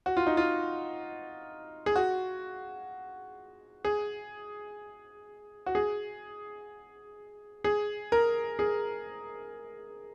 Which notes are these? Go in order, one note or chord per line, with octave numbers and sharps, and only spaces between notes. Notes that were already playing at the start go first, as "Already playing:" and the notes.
F#4
F4
D#4
F4
G#4
F#4
G#4
F#4
G#4
G#4
A#4
G#4